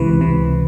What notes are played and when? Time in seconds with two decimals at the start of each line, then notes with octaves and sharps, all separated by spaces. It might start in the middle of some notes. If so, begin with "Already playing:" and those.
Already playing: C#2 C3 E3 B4
0.20 C#2 C3 E3